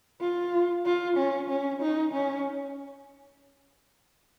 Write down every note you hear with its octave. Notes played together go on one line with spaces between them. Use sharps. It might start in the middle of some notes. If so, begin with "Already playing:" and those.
F4
F4
C#4
C#4
D#4
C#4